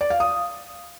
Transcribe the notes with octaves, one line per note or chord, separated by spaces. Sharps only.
D5
F5
D#6